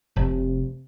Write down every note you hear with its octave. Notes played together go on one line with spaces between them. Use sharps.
F1 C3